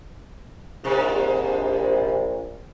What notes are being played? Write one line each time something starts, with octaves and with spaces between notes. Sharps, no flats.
A#1 G#2 C3